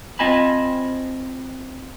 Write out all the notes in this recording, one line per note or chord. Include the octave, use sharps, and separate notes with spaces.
C4 F4 D#5 G#5 A5 B5